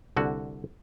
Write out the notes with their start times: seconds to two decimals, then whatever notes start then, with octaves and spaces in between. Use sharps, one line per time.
0.17 C2 D3 F#4